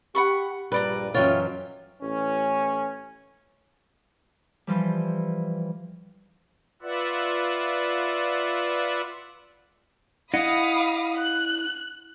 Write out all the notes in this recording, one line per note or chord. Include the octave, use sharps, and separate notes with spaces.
G4 F#5 B5 C#6
A#1 G2 G3 B4 D5 A#5
F#2 E3 F4 C#5 D#5 E5 G5
A1 C#4
E3 F3 G3
F4 B4 D5 E5 F#5
E4 D#5 F5 F#5 B5 D#6
F#6